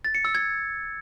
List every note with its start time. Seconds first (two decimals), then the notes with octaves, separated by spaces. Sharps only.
0.05 A6
0.15 C#7
0.25 E6
0.35 G#6